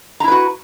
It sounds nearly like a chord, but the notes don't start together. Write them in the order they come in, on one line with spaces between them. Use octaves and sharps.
A#5 E4 B4 F#4